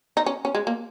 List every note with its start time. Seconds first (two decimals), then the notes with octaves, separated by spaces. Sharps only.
0.17 D#4
0.26 C#4
0.45 C#4
0.55 G#3
0.67 A#3